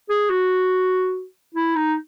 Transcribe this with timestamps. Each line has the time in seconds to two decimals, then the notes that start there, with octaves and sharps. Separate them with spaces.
0.09 G#4
0.30 F#4
1.54 E4
1.75 D#4